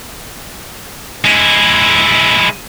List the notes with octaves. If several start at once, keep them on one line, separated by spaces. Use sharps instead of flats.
G#3 E4